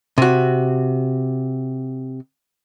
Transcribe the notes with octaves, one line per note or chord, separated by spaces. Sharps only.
C3 F#4